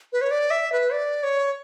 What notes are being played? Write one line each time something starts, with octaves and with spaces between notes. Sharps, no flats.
B4
C#5
D5
E5
B4
D5
C#5